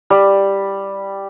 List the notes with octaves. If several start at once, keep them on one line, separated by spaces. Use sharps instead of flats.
G3